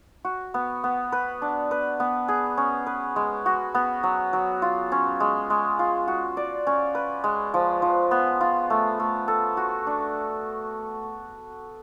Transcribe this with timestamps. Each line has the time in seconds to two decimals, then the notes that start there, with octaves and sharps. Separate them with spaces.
0.25 F#4
0.54 B3
0.84 B3
1.12 B4
1.42 D4
1.71 B4
2.00 B3
2.28 G#4
2.57 C#4
2.87 B4
3.16 G#3
3.46 F#4
3.75 B3
4.03 F#3
4.33 F#3
4.62 F4
4.92 C#4
5.20 G#3
5.50 G#3
5.79 F4
6.08 F#4
6.37 D5
6.67 C#4
6.95 B4
7.24 G#3
7.54 F3
7.82 F3
8.11 B3
8.41 F4
8.70 A3
9.00 A3
9.28 A4
9.57 F#4
9.87 D4